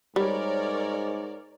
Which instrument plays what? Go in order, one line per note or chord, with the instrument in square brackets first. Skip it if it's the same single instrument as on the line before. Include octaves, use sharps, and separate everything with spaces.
[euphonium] G#2 [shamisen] G3 [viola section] A#4 C#5 D5